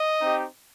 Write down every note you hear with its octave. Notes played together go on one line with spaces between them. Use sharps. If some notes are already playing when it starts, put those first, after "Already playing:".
Already playing: D#5
C4 D#4 G4